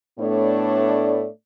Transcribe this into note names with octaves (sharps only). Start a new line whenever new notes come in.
A2 A3 B3 D4 C#5 D5